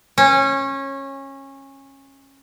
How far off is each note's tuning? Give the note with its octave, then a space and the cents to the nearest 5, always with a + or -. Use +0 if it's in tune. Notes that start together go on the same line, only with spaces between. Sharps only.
C#4 -20